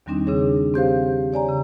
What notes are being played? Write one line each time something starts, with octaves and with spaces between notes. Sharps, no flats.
E2 D#3 G3 C4 D4 D#4
C#3 D4 D#4 G#4 C#5
C4 G4 C5 F5
C#5 D5 G#5 A#5
C#3